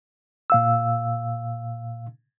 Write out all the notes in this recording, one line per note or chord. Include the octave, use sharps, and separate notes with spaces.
A#2 F5 E6